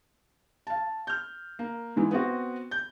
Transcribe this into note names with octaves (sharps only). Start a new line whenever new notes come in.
F5 A5
F6 G6
A#3
G#2 E3 G#3
B3 C4 F#4
G6